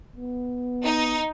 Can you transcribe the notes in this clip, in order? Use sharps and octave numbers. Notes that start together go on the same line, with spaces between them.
B3
D#4